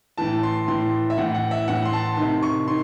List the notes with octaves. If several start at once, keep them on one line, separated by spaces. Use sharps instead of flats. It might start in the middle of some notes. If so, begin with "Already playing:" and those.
A2 E3 A5
C6
A2 E3 C6
E5
A2 E3 F#5
F#5
E5
A2 E3 F#5
C6
A5
C3 D#3 C6
C#6
D#3 C6